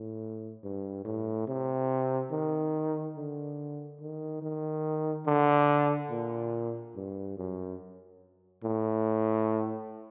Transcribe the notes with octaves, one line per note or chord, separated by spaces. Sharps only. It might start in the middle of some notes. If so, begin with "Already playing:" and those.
Already playing: A2
G2
A2
C3
D#3
D3
D#3
D#3
D3
A#2
G2
F#2
A2